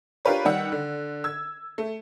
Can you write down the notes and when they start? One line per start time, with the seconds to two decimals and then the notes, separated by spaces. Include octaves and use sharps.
0.25 D4 F4 G4 A#4 B4 C#5
0.45 D#3 G3 F#5 E6
0.72 D3
1.24 E6 G#6
1.78 A3